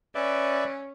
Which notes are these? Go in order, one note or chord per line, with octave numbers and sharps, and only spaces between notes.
C#4 B4 D5 E5